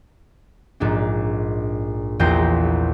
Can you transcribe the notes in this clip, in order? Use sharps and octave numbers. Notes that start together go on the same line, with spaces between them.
A#1 G#2 D4
A#1 E2 A#2 C5 G5 A#6